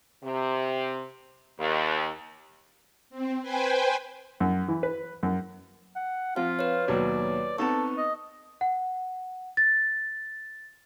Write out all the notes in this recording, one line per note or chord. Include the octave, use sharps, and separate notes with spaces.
C3
D#2
C4
B4 C5 G5 G#5
F#2
E3
B4
F#2
F#5
F3 C4 F4 F5
B4 C#5
D#2 B2 F#3 D5
B3 C4 D#4 A4 A5 C#6
D#5
F#5
A6